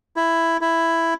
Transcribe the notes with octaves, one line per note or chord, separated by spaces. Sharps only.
E4
E4